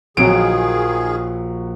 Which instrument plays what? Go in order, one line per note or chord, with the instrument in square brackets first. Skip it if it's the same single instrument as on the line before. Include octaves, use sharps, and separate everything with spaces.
[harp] A#1 [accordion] D#3 G#4 [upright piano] F#3 D7